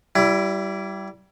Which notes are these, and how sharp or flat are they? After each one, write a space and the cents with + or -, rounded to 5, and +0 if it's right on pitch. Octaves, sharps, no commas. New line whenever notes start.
G3 -20 E4 +20